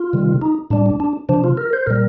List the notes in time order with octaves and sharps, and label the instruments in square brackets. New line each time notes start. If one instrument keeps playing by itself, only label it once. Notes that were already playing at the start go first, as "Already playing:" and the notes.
Already playing: [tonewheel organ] F4
C3 D#3 G3
D#4
A2 G3 D4
D4
D4
C3 F3 D4
F4
A#4
C5
A#2 G3 A#4